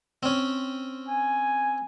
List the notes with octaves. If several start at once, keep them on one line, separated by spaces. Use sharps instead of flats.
C4 C#4
G#5